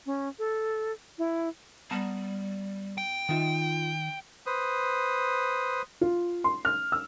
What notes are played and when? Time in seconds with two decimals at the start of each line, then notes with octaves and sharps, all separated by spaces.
0.06 C#4
0.39 A4
1.18 E4
1.91 G3 B3 A5 A#5
2.98 G5
3.29 D#3 D#4 F4 E5
4.46 B4 C5 D#6
6.01 F4
6.44 C6
6.65 F6
6.92 E6